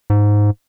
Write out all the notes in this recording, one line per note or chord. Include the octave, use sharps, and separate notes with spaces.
G#2